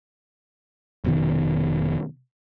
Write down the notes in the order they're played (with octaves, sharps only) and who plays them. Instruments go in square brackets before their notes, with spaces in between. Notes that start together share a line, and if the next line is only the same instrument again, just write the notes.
[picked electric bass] F1 B2 D#3